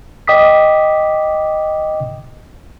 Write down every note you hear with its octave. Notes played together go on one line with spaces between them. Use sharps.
D#5 G5 D6 D#6 B6